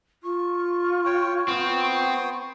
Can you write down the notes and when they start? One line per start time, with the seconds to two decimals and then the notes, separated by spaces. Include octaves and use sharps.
0.23 F4 C#6
1.06 C#5 G5
1.48 B3 C4 G5 D#6